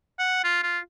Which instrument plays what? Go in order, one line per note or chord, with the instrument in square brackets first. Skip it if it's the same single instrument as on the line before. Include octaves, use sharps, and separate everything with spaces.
[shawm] F#5
F4
F4